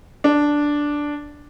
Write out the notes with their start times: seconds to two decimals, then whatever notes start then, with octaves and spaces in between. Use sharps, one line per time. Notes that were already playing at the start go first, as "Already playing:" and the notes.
0.24 D4